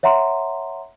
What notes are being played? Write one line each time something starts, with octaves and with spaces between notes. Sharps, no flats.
C#5 E5 F#5 A#5 C6